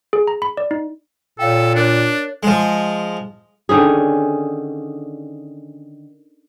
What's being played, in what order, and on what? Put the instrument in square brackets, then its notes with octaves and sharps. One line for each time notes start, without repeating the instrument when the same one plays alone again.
[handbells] G#4
A#5
B5
D5
D#4
[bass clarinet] A#2 [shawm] A4 [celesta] C#5 F5 G5
[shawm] D4 [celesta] A#4 C#5 F#6
[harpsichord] F3 G#3
[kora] D3 D#3 C#4 G#4